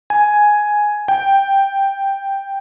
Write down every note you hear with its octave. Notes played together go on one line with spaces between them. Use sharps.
G#5
G5